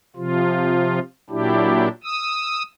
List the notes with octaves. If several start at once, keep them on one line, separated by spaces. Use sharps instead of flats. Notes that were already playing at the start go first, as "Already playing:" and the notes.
C3 F3 F4
A#2 F#3 D4 E4 G4
D#6 E6